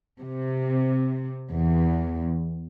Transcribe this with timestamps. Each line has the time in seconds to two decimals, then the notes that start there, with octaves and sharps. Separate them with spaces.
0.20 C3
1.52 E2